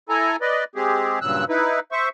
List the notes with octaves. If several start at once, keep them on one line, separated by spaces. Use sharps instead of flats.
E4 A4 G#5 A#5
B4 D5 D#5
G#3 C4 G4 G#4
G2 A#2 C#3 F#3 E6 F#6
D#4 E4 B4
C5 E5 C#6